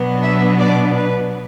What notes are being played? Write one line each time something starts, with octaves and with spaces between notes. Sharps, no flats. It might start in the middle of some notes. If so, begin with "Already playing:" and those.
Already playing: B2 F#3 B3 D4
E5
D5
B4